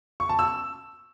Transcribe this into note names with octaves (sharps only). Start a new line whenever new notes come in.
C#6
A5
E6